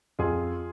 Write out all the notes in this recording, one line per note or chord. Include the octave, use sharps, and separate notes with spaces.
F2 F4 G#4